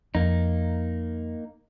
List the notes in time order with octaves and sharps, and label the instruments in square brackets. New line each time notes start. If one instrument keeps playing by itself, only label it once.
[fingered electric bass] F2 [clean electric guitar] A#3 D#4